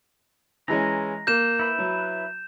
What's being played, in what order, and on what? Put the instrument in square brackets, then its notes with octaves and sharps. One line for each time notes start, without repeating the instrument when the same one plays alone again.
[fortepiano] E3 G#3 C#4 [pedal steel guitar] A#5
[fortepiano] A#3 [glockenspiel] G6 E7
[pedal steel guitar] E4 B4
[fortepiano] F#3